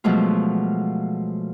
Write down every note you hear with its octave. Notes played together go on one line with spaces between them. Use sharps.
B2 F3 F#3 G#3 A3 F4